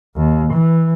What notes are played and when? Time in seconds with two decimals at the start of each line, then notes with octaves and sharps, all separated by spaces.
0.16 D#2
0.53 E3